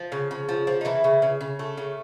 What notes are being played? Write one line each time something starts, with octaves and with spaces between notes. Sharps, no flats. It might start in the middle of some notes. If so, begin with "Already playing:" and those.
Already playing: F3
C#3
C#3
F3
F3
D#4
C#3 E3 E4
C#3
C#3
C#3
A3
C#3